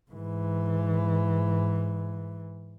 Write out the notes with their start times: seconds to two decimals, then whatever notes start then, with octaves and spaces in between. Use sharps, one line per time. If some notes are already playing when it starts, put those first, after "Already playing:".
0.11 G#2 E3